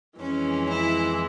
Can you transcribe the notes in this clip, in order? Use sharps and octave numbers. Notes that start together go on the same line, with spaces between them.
F2 E3 G#3 C#4
E4